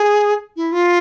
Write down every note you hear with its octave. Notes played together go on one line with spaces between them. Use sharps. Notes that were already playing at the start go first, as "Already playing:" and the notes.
Already playing: G#4
E4
F4